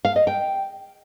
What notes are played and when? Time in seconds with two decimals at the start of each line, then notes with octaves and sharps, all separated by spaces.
0.05 F5
0.16 D#5
0.27 G5